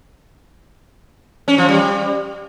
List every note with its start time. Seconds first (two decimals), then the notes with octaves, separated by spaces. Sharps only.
1.48 C#4
1.58 F3
1.69 G3